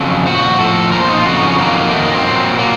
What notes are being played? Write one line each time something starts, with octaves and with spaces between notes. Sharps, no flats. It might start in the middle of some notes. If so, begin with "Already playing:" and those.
Already playing: F2 C#3 F#3 A4
A#2 F3 F#4
A2 F3 A4
A#2 F3 A#4
C5
D#4
F4
F2 C#3 F#3 F#4
D#4
C#4
F2 D#3 F#3 A#3
F#2 D#3 F#3 A3
A#3
C4
A#2 F#3
A#2 F#3 A#3